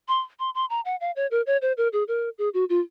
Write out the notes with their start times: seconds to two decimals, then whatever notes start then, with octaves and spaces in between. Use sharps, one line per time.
0.08 C6
0.39 C6
0.55 C6
0.70 A#5
0.85 F#5
1.01 F5
1.16 C#5
1.31 A#4
1.46 C#5
1.62 C5
1.77 A#4
1.93 G#4
2.08 A#4
2.38 G#4
2.54 F#4
2.69 F4